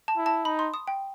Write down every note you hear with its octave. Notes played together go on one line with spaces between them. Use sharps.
A5
E4
A5
D#4 B5
C6
D#6
G5